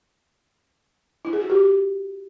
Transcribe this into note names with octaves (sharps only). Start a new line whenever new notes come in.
E4
G#4
F#4
G4